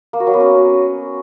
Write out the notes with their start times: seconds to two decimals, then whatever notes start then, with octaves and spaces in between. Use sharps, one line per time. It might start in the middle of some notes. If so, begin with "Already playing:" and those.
0.13 A#3
0.20 F#4
0.27 F#3
0.34 B3
0.40 C#4